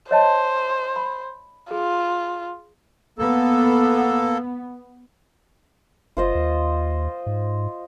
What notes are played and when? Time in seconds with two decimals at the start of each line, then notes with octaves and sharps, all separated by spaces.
0.11 C5 C#5 D#5 A5
0.96 B5
1.71 F4 G#4
3.19 A#3 B3 A4
6.17 F#1 F4 C5 D#5
6.35 D#2
7.26 G#2